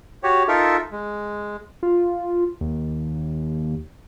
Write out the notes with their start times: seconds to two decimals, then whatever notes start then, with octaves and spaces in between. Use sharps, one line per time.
0.23 F#4 G4 C#5
0.48 D#4 F4 A4 A#4 E5
0.91 G#3
1.83 F4
2.61 D#2